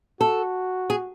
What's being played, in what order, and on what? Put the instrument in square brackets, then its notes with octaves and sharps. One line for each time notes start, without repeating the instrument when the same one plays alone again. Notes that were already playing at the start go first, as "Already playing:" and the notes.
[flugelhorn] F#4 [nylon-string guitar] A4
[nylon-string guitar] G#4